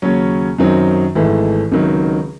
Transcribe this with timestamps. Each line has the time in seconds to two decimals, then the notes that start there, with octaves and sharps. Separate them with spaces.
0.02 D#2 C#3 F#3 C#4
0.58 F#2 D#3 F#3 C4 D#4
1.15 G#1 G#2 E3 A3
1.72 C#2 C3 D#3 F#3